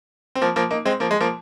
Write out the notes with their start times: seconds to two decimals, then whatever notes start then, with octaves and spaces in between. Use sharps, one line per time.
0.35 C4
0.41 F3 A#3
0.56 F3 A#3
0.71 A#3 D#4
0.85 G#3 C4
1.00 F3 A#3
1.11 G#3
1.20 F3 A#3